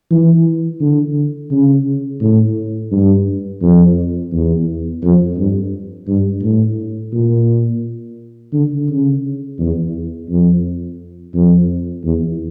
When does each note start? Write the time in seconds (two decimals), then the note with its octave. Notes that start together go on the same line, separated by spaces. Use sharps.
0.11 E3
0.80 D3
1.51 C#3
2.21 A2
2.91 G2
3.61 F2
4.32 E2
5.02 F2
5.37 G2
6.07 G2
6.42 A2
7.12 A#2
8.53 D3
8.88 C#3
9.59 E2
10.29 F2
11.34 F2
12.04 E2